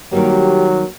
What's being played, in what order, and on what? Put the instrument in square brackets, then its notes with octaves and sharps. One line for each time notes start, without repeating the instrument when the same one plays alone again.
[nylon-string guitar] D#3 G3 A#3 [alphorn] F#3 [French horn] G4